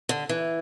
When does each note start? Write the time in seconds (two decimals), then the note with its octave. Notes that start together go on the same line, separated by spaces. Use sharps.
0.09 D3
0.29 E3